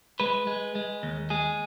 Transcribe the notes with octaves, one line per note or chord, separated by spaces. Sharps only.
G#3 B4
G#3
G#3
D#2
G#3 G#4